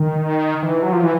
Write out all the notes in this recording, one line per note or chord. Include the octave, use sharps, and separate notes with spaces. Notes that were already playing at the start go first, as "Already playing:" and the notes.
Already playing: D#3
E3
F#3
F3
E3